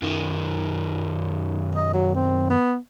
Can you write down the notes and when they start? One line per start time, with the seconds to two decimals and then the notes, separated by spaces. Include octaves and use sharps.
0.02 F#2 D#3
1.75 D#5
1.93 F#3
2.15 C4
2.50 B3